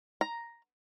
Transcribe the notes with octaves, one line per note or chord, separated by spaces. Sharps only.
A#5